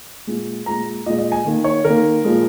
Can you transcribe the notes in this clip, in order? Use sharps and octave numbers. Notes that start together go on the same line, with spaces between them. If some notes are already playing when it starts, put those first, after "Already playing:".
A#2 G#3
A#2 G#3 A#5
A#2 G#3 D#5
D#5
G#5
D#3 A#3
C#5
D#3 A#3 A#4
A#2 F3 G#3